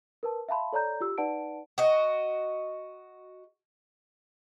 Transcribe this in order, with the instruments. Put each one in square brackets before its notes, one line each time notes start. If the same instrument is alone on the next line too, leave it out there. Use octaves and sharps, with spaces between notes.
[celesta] A#4 B4 A5
E5 F5 A5 B5 C6
A4 C#5 D5 A#5 G6
F4 G4 E6
D#4 B4 D5 F#5 A5 D7
[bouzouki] F#4 D#5